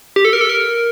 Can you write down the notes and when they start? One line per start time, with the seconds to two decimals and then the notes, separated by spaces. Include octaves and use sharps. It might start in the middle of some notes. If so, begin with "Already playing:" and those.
0.16 G4
0.25 A4
0.33 A#4
0.41 A4
0.49 A#4